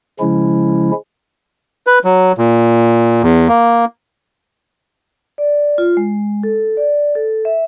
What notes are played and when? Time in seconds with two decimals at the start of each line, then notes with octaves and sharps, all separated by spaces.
0.20 C#3 F3 G#3 C#4 E4
1.87 B4
2.04 F#3
2.38 A#2
3.23 E2
3.49 A#3
5.38 D5
5.78 F4
5.97 G#3
6.43 A4
6.77 D5
7.15 A4
7.45 E5